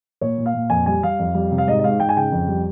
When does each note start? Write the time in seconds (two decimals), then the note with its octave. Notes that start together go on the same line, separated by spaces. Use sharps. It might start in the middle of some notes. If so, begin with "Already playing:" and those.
0.21 A#2 C#5
0.38 A#2
0.46 F5
0.54 A#2
0.70 F2 G#5
0.86 G3 G#5
1.03 G3 F5
1.19 F2
1.35 G3
1.51 C3
1.58 F5
1.67 G#2 D#5
1.79 D#5
1.84 G#2 F5
2.00 G#2 G5
2.09 G#5
2.17 C#3 G5
2.32 F2
2.48 G3